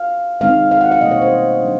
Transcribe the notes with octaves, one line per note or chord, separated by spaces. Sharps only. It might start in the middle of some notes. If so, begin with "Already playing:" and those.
Already playing: F5
D#3 G#3 C4 D#4 F5
F5
F#5
F5
B2 G3 A#3 D#5
C#5
C5
F#3 A3 D4